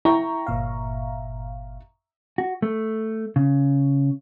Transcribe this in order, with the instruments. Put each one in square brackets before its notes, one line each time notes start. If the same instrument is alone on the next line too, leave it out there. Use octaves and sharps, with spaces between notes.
[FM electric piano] E4 G5 [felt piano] E5 A#5 C#6
[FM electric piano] G1 A#2 F5
[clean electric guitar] F#4
A3
C#3